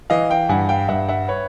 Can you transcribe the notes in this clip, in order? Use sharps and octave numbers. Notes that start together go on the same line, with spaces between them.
E3 D#5 F5
F5 G5
G2 F#5 G#5
F5 G5
G2 E5 F#5
E5 F#5
B4 C#5